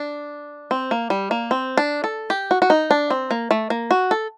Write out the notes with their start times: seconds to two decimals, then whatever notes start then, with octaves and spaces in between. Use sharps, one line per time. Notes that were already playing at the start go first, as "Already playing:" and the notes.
Already playing: D4
0.71 C4
0.91 A#3
1.10 G3
1.31 A#3
1.51 C4
1.77 D4
2.04 A4
2.30 G4
2.51 F#4
2.62 F#4
2.70 D#4
2.91 D4
3.10 C4
3.31 A#3
3.51 A3
3.70 A#3
3.91 F#4
4.11 A4